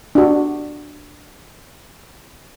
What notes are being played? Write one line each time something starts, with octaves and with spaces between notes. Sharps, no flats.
D4 F#4